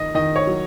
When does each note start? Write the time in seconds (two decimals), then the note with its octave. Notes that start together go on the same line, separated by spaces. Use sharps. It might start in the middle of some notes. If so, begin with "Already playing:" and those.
Already playing: D#3 D#4 D#5
0.15 D#3 D#5
0.36 C#5
0.47 F#3